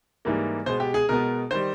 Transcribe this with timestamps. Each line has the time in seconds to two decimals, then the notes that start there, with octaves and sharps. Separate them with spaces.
0.25 G#2 E3 G3 A#3
0.66 B2 G#3 B3 C5
0.80 G4
0.94 G#4
1.09 B2 G#3 B3 A#4
1.51 D#3 G3 C5